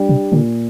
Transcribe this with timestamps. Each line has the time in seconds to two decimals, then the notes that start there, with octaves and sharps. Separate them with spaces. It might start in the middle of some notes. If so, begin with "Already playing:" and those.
Already playing: G3 D4 G4
0.09 C3
0.32 A#2 D3